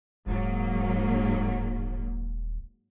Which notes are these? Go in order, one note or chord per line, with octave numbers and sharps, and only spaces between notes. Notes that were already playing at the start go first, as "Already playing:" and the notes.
D#1 G#2 F#3 A#3